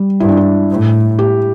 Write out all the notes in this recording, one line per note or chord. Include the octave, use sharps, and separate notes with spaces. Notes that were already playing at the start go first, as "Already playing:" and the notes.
Already playing: G3
G2 E4
D4
E4
A2
G4